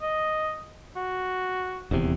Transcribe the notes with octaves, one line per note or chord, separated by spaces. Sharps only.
D#5
F#4
D#1 E2 C3